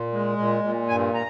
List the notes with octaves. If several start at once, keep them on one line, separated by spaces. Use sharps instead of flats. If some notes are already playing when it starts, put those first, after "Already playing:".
Already playing: A#2
G#3
A#2
A#2
G2 G#5
A#5